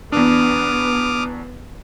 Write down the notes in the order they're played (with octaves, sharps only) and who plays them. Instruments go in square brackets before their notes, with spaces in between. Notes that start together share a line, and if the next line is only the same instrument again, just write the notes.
[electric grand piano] E2 D4 [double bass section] B3 [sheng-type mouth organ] D6 D#6 F6